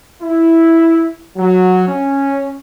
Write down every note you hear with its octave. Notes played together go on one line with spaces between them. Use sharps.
E4
F#3
C#4